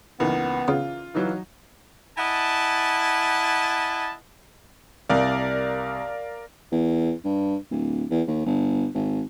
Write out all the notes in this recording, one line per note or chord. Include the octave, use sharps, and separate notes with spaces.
C#2 E3 A#3 B3 D#4
C#3 F4
E3 F#3 D#4
E4 D#5 F#5 G#5 A5
C2 A#4 D5 F5
E2
G2
D1
E2
D#2
G1
G#1